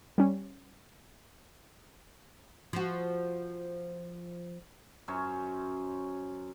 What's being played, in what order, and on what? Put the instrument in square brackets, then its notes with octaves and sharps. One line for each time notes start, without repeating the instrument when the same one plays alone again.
[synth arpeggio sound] G3 C#4
[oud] F3 F#4
[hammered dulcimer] F#2 C#4 C5 C#5